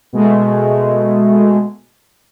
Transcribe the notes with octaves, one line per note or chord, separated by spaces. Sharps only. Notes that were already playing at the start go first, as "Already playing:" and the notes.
B2 G#3 A3